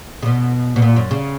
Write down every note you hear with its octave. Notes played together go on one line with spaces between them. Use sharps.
C#3
B2
B2
A#2
F#2
C#3